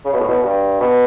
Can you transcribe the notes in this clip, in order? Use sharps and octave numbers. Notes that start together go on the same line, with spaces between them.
C#3
B2
A2
B2
G2
B2